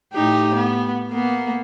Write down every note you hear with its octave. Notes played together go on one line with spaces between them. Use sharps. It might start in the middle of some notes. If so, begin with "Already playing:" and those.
A2 D#4 G4
B3
A#3 B3